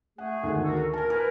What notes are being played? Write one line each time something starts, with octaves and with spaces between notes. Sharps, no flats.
A3 G#4 F#5
D2 D#3 F#5
F#4 A4 A#4
A#4 G#5 A5
E4 A#4 B4 F6